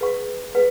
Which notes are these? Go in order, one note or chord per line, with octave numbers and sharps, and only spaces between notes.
G#4 B4 F#5 C#6
G#4 B4 F#5